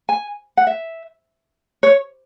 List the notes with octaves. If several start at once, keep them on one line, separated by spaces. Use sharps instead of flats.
G#5
F#5
E5
C#5